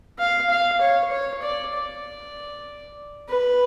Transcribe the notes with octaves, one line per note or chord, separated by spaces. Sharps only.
F5
F5
C#5
C#5
D5
D5
B4